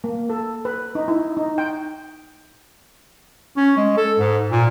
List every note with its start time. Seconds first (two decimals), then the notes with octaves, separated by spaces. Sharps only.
0.04 A#3
0.30 A4
0.65 B4
0.95 D#4
1.08 E4
1.37 D#4
1.58 G5
3.57 C#4
3.77 G#3
3.97 A4
4.19 G#2
4.51 A#2